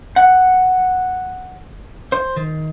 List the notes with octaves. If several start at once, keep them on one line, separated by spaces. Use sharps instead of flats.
F#5
C5
D#3